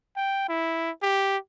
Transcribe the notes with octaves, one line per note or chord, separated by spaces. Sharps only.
G5
E4
G4